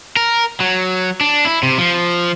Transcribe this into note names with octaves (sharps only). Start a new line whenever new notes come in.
A#4
F#3
D4
E4
C3
F3